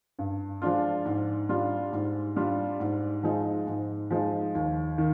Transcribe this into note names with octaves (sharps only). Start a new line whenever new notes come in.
G2
F3 G#3 D4 F4
G#2
G3 D4 F4
G#2
G3 D4 F4
G#2
F3 G#3 D#4
G#2
F3 G#3 D#4
D#2
D#3